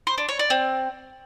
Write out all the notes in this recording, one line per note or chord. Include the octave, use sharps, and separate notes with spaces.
C5
D4
C#5
D5
C4